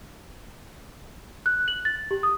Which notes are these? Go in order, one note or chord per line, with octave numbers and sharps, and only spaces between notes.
F#6
F#7
A6
G4
D#6